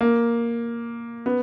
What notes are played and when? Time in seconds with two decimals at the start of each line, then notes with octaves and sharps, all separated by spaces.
0.01 A#3
1.26 B3